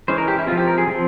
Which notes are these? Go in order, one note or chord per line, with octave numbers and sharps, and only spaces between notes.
E3 G#3 C#4 C5
A#4
G4
E4
F3 C4 F4
G4
A#4
G#4
F3 C4